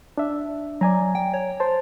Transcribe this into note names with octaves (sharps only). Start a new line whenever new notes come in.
D4 E5
F#3 D5 G#5 A#5
G5
C#5
C5 A5